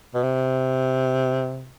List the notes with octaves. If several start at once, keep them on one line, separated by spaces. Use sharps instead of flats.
B2
C3